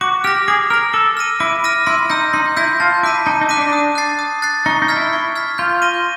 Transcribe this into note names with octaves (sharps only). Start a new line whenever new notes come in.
F#4 D6
G4 F6 A#6
G#4 D6
A#4 F6 A#6
A4 D6
F6 A#6 D#7
E4 D6
F6 A#6 D#7
E4 C6
D#4 E6 G6 A#6
D#4 C6
E4 E6 G6 A#6
F4 A5
E4 D6 F#6 B6 D#7
D#4 A5
D#4
D6 F#6 B6 D#7
D4
D#6
F#6 A6 C7
D#6
F#6 A6 C7
D#4 C#6
D#4
F6 G#6 B6
E4
C#6
F6 G#6 B6
F4 G6
A#6 D#7 G7